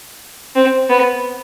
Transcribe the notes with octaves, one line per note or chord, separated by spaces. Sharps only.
C4
B3